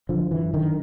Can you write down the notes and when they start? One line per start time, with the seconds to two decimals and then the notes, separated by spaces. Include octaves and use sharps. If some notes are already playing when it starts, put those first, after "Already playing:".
0.09 D3 F3
0.31 F#2 E3
0.54 D3 D#3